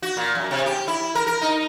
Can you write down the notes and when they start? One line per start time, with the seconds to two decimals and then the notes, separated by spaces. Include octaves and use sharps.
0.02 F#4
0.17 A#2
0.35 F#2
0.51 C3
0.66 G4
0.88 E4
1.15 A#4
1.27 A#4
1.42 D#4